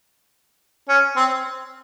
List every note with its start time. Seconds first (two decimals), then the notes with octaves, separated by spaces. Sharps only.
0.89 C#4
1.16 C4